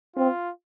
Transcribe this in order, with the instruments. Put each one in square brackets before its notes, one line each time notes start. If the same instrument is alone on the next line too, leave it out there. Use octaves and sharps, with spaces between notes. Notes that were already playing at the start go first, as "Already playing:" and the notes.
[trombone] C4 [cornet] F4